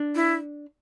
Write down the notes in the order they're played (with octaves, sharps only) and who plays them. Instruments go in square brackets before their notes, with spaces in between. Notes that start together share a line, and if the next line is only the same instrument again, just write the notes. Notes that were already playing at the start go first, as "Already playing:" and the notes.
Already playing: [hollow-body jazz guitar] D4
[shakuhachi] E4